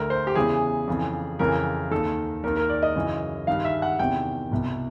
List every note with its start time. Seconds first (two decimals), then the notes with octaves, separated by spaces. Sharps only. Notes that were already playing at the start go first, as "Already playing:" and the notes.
Already playing: D2 D3 A#4
0.10 C5
0.27 G4
0.35 E2 C#3 E3 G#4
0.88 F2 C#3 E3
1.39 F2 C#3 E3 A#4
1.91 D#2 D#3 A4
2.43 D#2 D#3 A#4
2.56 A#4
2.69 D5
2.83 D#5
2.95 F#2 C#3 E3
3.47 G2 D#3 F5
3.64 E5
3.82 F#5
3.99 E2 C3 D#3 G5
4.51 C2 B2